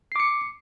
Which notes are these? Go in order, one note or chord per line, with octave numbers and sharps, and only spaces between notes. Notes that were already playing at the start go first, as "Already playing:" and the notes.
D6 C7 C#7